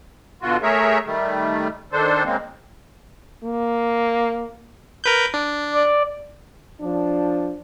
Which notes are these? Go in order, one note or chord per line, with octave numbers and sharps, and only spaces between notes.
B2 D3 F4 F#4
A3 G#4 A#4 C#5 E5
D#3 G3 A3
D#3 D4 A4 C5
C#3 G#3 A#3 C4
A#3
A#4 B4 G6
D4
D5
F3 D4